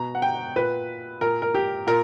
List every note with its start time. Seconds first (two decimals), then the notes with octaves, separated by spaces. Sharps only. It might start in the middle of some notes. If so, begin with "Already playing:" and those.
Already playing: B2 A#5
0.15 F#5
0.22 G5
0.56 A#2 B4
1.21 A#2 A#4
1.42 A#4
1.54 G4
1.87 A#2 A#4